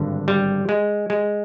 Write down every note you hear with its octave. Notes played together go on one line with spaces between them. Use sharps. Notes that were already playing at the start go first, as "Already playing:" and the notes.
Already playing: G#1 G2 D3
G3
G#3
G#3